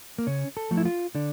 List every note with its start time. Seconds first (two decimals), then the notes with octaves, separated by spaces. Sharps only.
0.18 A#3
0.27 C#3 C#4
0.57 A4
0.71 F3 A3
0.77 E4
0.85 F4
1.15 D3 D4